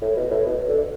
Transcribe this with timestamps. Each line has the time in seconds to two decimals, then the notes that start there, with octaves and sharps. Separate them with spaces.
0.02 A2
0.16 B2
0.31 A2
0.45 B2
0.68 D3